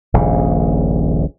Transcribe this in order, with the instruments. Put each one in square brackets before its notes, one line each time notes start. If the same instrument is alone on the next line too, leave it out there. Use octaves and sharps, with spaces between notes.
[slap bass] D#1 A#1 G#2 C#3